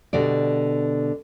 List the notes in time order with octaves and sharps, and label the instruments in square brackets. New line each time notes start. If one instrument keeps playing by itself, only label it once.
[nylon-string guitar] B2 D3 G3 D5